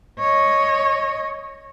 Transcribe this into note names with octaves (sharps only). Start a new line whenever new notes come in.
C#5 D#5